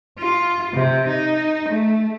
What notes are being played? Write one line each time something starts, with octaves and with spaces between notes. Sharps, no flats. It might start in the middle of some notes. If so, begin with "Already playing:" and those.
F4
C3
D#4
A3